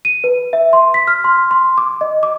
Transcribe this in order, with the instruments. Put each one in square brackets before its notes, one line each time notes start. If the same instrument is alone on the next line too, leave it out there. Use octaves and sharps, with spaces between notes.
[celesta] D#7
B4
E5
C6
B6
F6
C6
C6
D6
D#5
D6